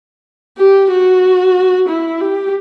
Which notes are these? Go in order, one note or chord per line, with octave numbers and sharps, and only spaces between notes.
G4
F#4
E4
G4